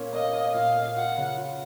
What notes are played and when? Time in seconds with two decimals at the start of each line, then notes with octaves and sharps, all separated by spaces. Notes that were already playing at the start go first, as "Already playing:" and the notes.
Already playing: A#2 A#3 C#4
0.13 A#3 D#5
0.33 A#3
0.54 A#2 F5
0.75 A#3
0.96 F4 F#5
1.18 C#3
1.37 F4